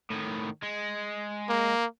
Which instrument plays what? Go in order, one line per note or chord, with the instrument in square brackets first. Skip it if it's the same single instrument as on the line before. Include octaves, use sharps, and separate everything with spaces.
[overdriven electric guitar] A2 D#3
G#3
[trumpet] A#3